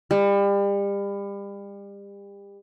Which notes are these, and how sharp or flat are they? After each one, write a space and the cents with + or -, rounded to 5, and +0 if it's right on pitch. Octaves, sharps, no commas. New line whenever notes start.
G3 +35